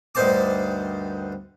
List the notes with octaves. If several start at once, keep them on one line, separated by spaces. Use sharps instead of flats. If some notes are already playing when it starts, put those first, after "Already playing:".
D2 G2 D#3 C5 A5 D6